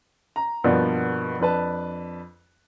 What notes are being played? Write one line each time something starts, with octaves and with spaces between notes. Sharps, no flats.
A#5
G2 B2 F3 A#3 B3 D4
F2 D4 B4 A5